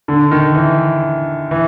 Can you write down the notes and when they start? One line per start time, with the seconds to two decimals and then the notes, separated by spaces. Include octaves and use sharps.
0.08 D3
0.31 D#3
0.55 E3
1.51 E3